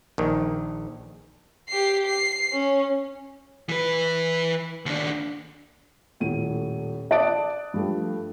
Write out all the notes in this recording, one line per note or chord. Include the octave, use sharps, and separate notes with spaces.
A#1 D#3
G4 C7
C7
C#4
E3 B4
D#2 D4
D#1 A2 D#7
D5 A5 D#6 F#6 A6 D7
G2 F3 G3 A3